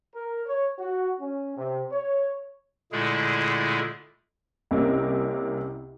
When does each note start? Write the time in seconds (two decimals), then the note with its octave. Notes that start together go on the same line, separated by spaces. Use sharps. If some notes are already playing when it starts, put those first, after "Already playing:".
0.15 A#4
0.46 C#5
0.79 F#4
1.20 C#4
1.57 C3
1.92 C#5
2.92 A#2 D3 G#3 A3 E4 G#4
4.71 C2 C3 A#3 C#4 D#5